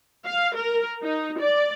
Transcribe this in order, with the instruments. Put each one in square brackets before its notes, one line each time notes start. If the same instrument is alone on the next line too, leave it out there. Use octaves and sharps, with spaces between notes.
[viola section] F5
A#4
D#4
D5